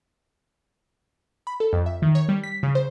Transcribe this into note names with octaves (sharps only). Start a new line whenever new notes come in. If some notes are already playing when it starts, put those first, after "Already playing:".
B5
A4
F2
E5
D#3
C#5
G3
B6
C#3
C5